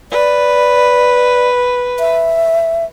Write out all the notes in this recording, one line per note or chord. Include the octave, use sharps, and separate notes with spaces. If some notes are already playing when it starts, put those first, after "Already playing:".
B4 D5
E5